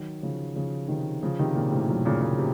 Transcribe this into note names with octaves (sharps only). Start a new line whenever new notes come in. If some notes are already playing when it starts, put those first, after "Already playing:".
Already playing: D#3 F#3
C#3 F3
C#3 F3
C3 D#3
C#3 F3
C3 D#3
A#2 C#3
A2 C3
F#2 A#2
A#2 C#3
A#2 C#3
C3